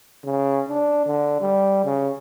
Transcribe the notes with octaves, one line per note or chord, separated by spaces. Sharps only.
C#3
D4
D3
G3
C#3